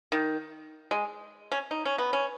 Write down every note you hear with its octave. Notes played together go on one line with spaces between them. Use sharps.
D#3
G#3
C#4
D#4
C#4
B3
C#4